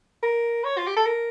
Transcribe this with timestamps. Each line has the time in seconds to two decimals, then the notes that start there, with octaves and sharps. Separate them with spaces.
0.23 A#4
0.64 C#5
0.78 F4
0.87 G4
0.96 A4
1.06 A#4